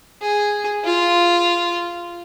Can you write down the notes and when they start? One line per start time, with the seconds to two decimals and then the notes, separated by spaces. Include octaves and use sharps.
0.22 G#4
0.85 F4